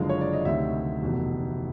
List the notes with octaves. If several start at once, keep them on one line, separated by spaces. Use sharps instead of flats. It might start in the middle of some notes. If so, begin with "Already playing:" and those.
Already playing: F#1 F#2 D3 F3 G#3 F5
C#5
D5
D#5
D2 C3 D#3 E5
F1 E2 B2